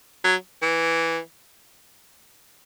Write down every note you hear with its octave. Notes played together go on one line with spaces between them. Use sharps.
F#3
E3